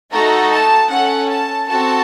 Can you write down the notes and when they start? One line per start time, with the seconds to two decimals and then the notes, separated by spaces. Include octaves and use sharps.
0.12 A3 D#4 F#4 A4 A#5
0.51 A5
0.90 C#4 A4 F#5
1.30 A5
1.69 C4 F#4 A4 A5